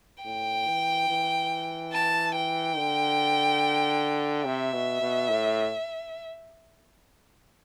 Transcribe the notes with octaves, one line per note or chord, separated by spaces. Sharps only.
A2 G5
E3
E3
A5
G5
D3
C3 E5
B2
B2
A2